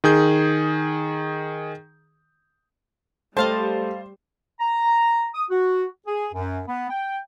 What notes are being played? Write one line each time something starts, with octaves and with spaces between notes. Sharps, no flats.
D#3 G#4 G6
G3 A3 C5 D#5 F5 A5
A#5
D#6
F#4
G#4
F#2
B3
G5